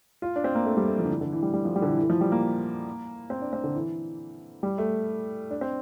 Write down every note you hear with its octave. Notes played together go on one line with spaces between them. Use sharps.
F4
D4
C4
A#3
A3
G3
A3
F3
D3
E3
D3
E3
G3
G3
F3
G3
D3
E3
E3
F3
G3
A#3
C4
D4
C4
D3
E3
G3
A3
D4
C4